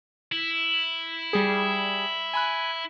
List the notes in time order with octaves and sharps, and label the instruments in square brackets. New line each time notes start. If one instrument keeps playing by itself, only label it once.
[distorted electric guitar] E4
[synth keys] G3 G#4
G#5 B5 F#6